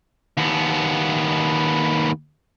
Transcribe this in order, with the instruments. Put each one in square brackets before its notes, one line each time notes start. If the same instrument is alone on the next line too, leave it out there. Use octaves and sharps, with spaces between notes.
[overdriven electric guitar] D#2 B3